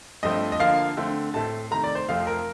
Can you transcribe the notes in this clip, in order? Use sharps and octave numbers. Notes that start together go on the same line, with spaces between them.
G2 F3 A3 C4 D#5
D#5
D3 F3 A#3 F5
D3 A3 C4
A2 A3 C4 A5
C3 D#3 A3 A#5
D5
C5
F2 C3 F3 A3 C4 F5
A#4